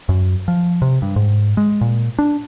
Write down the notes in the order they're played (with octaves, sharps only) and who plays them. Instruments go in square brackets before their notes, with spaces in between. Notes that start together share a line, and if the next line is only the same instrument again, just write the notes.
[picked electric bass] F#2
F3
C3
G2
G#2
G#3
A#2
D4